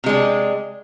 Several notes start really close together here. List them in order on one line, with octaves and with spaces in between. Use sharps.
C3 G#3 D4